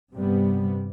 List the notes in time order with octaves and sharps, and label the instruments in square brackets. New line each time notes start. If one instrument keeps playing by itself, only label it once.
[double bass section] G2 C3 G3 B3